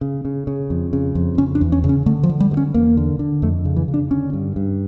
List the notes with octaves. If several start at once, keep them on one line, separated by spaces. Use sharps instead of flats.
C#3
C#3
C#3
F2
C#3
F2
C#3 C#4
D4
E2
C#4
C#3
C#4
D3 A3
F3
D3
G3
G2
C#4
E2 A#3
D3
D3
F2 A3
C#3
E3
C#3
D4
D3 C#4
G2
G2